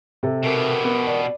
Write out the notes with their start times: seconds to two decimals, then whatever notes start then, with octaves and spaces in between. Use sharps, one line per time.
0.23 C3 A4
0.43 B2 G4 A#4
0.84 B3
1.07 D5